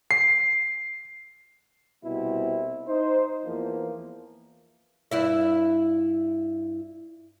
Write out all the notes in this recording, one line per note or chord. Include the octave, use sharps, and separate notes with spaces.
C7
C2 B2 C4 E4
D#4 C5
E2 E3 F3 A#3
G2 E4 E5